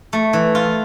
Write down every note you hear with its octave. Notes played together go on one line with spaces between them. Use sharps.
A3
E3
F4